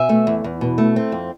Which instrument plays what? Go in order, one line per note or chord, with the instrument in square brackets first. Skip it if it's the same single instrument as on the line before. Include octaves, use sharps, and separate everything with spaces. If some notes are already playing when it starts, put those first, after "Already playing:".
Already playing: [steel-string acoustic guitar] B2 E5 G#5
A3
E2
E2
B2
A3
C4
F2